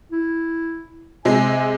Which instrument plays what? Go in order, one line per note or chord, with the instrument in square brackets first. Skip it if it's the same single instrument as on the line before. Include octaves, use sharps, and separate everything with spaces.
[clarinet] E4
[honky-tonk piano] C3 G#3 [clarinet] G#5